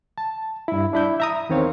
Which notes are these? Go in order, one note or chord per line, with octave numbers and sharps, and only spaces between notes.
A5
G2 E4
D4 E4 G6
E5 A#5 D#6
E2 D#3 C4 C#5 F5